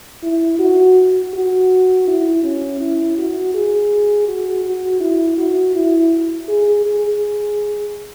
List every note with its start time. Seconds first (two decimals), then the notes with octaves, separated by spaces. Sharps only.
0.23 E4
0.59 F#4
1.34 F#4
2.07 E4
2.43 C#4
2.81 E4
3.18 F#4
3.54 G#4
4.28 F#4
4.65 F#4
5.00 E4
5.38 F#4
5.75 E4
6.48 G#4
6.85 G#4